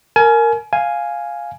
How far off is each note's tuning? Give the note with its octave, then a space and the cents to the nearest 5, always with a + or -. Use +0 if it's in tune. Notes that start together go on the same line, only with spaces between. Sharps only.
A#4 -10 G#5 +30
F5 +0 G#5 +0